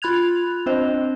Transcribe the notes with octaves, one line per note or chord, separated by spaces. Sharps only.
F4 B5 F#6 G#6 F7
C4 D4 C5 D#5